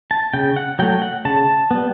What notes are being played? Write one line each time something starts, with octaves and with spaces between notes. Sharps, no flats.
A5
C#3 G5
F#5
F#3 A3 G5
F#5
C#3 A5
G3 B3